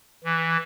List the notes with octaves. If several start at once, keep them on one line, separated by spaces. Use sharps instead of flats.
E3